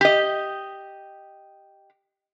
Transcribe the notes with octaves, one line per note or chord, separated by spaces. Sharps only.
G4 D#5